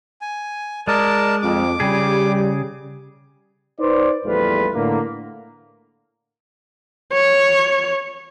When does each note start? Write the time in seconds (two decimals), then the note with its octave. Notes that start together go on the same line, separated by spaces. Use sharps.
0.21 G#5
0.87 G#3 A#4 D5 A5
1.42 F2 D6
1.80 C#3 G3 G#4
3.79 D#4 B4 C5 D5
4.25 A#1 E2 G3 A3 F4 B4
4.74 A2 D3 A3 A#3
7.13 C#5